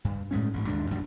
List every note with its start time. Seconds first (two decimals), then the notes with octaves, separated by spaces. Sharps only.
0.05 G2
0.31 A2 G#3 A3 C#4
0.54 A1 G#2
0.67 D#2 G#2 G#3 D4
0.90 A1 F#2 B2 D4